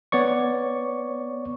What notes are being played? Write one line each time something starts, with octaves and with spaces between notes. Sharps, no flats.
B3 C#5 D5 C#6